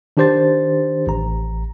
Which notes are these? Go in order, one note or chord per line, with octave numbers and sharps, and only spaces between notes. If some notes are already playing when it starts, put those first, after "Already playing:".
D#3 D4 G4 C5 C6 A6
A1 A#5